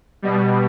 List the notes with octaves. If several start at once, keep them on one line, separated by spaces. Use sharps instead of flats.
B2 G3